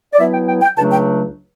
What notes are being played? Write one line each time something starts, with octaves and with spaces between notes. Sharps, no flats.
D5
B2 F#3 B3 E4 E5
G5
G5
G5
C#2 C#3 F#3 A3 D4 A5
G5